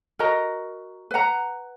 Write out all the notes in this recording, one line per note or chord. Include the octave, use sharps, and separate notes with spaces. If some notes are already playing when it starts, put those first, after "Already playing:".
F#4 A#4 D#5 A#5
B4 F#5 A#5